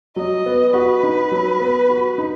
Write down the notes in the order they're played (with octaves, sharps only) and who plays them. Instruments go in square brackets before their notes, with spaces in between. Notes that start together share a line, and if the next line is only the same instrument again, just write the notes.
[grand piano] F#3 [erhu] D#5
[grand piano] B3
[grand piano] F#4 [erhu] B4
[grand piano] D#4
F#3
B3
F#4
D#4